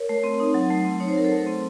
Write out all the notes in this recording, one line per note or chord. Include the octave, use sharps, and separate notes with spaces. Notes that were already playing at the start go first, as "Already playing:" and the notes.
Already playing: A#4 C#5
A3
C4
D#4
F#3
A3
C4
D#4 C#5
C5
F#3 A#4
A4 C5
A3
C4